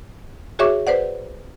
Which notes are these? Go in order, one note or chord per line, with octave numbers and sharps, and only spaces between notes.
F#4 G#4 C#5 E5 C#6 D6
B4 C5 D5 F#5